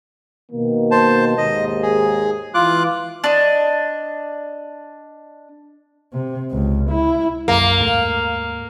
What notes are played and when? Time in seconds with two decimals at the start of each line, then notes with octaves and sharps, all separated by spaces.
0.52 B2 D#3 A#3
0.91 C5 A5
1.38 D#2 G#2 D#5
1.82 G#4
2.54 E3 F4 D6 F#6
3.24 D4 D#5
6.13 C3
6.51 C#2
6.91 E4
7.48 B1 F#2 A#3
7.79 D#2 G#2 A3